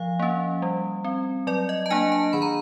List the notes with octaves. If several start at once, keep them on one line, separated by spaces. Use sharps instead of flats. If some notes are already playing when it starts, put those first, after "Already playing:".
Already playing: F3 F5
A#3 C#4
G3
C4
F#3 D5
D#5
A5
A#3 D4 G#5
A5
D#3 B5
A#5